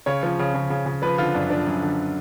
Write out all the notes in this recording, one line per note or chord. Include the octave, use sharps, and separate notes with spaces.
C#3 C#5
F3
C#3
C#3
C#3
C#3
F3 B4
D3 F4
F#2 D4
F3 D4
F#2
D3